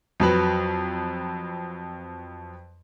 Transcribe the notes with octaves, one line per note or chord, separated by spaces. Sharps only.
F2 F#3 B4